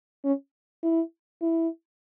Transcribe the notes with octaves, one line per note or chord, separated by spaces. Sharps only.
C#4
E4
E4